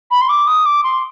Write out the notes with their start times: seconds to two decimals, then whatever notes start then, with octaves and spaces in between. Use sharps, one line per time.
0.11 B5
0.21 C6
0.29 D6
0.47 D#6
0.66 D6
0.84 C6